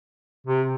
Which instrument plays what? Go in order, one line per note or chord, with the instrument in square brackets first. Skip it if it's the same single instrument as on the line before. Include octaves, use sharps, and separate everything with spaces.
[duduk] C3